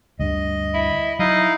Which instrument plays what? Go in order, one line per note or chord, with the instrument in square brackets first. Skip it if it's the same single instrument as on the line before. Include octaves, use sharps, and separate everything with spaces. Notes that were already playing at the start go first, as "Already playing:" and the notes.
[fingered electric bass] D2 G2 [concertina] D#5
[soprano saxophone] E4
[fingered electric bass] F#3 [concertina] D#4 E4 F5 [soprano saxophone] D#5